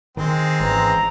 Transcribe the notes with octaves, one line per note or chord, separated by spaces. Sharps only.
D#3 G#3 C4
G#1 E3 A#5